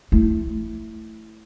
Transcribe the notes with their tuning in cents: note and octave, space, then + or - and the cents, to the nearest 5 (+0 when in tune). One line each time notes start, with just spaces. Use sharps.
A3 +0 E4 +0